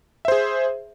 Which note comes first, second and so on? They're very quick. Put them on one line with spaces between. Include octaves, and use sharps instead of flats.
E5 C5 G#4